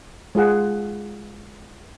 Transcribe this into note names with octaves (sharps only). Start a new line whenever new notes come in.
G#3 F4 G#4 F#5